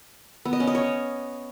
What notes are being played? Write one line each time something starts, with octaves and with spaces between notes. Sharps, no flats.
B3
D#5
C#4
D#5
C#5